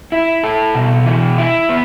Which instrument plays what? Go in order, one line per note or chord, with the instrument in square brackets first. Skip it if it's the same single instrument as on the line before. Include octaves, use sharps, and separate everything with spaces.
[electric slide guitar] E4
A4
B2
E3
E4
B3